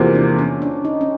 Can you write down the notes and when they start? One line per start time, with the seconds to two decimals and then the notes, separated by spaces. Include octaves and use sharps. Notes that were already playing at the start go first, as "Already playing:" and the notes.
Already playing: E2 C3 F3 A#3
0.15 D4
0.39 C#4
0.62 D4
0.85 D#4
1.01 C#4